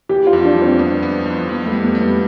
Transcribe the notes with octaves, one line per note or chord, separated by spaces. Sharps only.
E3 G4
F4
F2
D4
G3
C4
B3
B3
F2
F2 B3
A3
G3
B3
G3
B3